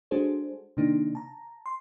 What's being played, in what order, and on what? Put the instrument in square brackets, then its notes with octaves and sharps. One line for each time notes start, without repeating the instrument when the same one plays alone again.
[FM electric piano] G#3 D4 F#4 G#4 A4 C5
C3 D#3 A#3 D4 D#4
A5 A#5
C6